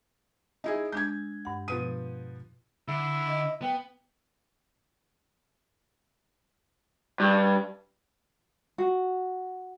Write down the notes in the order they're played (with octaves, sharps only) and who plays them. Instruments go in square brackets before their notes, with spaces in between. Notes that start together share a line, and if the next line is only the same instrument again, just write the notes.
[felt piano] D#4 E4 G#4
[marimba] G#3 D4 [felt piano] G6 G#6
[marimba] G2 F#5
[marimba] B2 [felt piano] F3 B3 D#7
[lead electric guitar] D3 [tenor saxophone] E4
[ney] D#5
[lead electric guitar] B3 [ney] G5
[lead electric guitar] G2
[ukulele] F#4